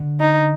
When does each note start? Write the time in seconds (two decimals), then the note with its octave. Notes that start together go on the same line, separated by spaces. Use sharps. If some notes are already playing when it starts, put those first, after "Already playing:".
Already playing: D3
0.20 D#4